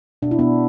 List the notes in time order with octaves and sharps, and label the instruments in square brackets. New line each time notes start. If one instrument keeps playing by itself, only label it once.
[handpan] B2 D4
E4
B2 B3 D4